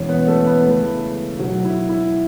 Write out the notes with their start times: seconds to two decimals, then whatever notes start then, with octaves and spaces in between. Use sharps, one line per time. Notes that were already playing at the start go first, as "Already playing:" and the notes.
Already playing: E1 E2 E3 C#4 C#5
0.09 B3 B4
0.27 A3 A4
0.46 B3 B4
0.64 C#2 C#3 E3 A3 A4
1.39 B1 B2 F#3 F#4
1.65 E4
1.89 E4